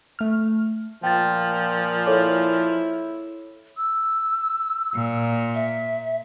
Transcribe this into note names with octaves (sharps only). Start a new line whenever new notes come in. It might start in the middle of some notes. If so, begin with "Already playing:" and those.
A3 F6
A#2 F3 G5 A6
E4 A4 C#5 D6
E6
A#2
E5